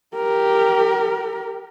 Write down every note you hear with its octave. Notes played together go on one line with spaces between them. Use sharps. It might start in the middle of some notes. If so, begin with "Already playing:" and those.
G4 A#4